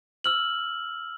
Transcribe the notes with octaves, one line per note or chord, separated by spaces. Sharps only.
E6 F6 F#7